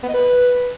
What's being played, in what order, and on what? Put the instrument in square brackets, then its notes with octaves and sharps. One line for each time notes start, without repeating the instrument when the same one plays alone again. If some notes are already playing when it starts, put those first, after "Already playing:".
[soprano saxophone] B3
D#5
B4